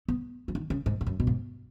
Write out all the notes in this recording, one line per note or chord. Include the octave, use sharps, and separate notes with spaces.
B3
F#3
D#3
C#3
G#2
G#2
F#2
B2
G#2